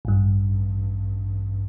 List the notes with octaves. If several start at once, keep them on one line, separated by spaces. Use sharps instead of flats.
A1 G2